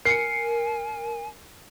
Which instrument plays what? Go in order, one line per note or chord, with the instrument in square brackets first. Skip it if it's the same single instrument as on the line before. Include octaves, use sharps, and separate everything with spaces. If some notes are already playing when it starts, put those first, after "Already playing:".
[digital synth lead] A#4 [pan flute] G#5 [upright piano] C7 C#7